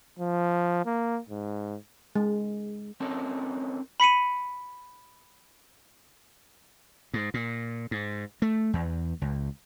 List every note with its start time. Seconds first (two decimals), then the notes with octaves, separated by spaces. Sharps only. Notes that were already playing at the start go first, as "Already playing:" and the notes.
0.19 F3
0.86 A#3
1.29 G#2
2.16 G#3
3.00 C4 C#4 D#4 A4 A#4 C#5
4.00 B5 B6 C#7 D#7
7.14 G#2
7.34 A#2
7.91 G#2
8.42 A3
8.73 E2
9.22 C#2